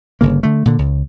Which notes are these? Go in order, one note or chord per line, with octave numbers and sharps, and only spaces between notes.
G1 C#3 A#3
D3 A3
A#2 D3
C#2